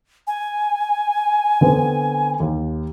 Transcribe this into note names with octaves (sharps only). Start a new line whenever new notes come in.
G#5
D3 B3 C4
D#2